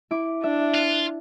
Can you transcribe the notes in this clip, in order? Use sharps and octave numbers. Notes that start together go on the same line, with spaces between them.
E4 D6
D4 E5
F4